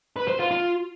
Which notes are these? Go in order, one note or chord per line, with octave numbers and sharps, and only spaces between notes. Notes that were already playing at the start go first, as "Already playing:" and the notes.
B4
C5
F4
F4